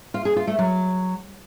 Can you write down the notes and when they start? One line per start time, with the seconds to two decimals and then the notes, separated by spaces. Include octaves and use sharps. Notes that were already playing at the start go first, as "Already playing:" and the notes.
0.14 F4
0.25 G#4
0.36 F4
0.47 A3
0.58 F#3